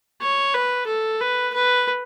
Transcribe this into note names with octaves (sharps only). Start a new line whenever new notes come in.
C#5
B4
A4
B4
B4